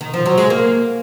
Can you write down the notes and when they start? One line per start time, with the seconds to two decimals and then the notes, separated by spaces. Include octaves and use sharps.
0.01 D#3
0.14 F3
0.26 F#3
0.38 G#3
0.50 A#3